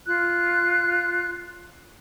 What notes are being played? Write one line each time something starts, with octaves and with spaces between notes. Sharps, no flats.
F4 F#6